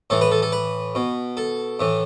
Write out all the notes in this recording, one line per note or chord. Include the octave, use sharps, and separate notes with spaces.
A2 E3 A4
B4
A4
A4
B4
B2
A4
A2 E3